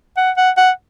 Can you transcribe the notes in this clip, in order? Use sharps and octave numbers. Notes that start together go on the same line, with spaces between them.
F#5
F#5
F#5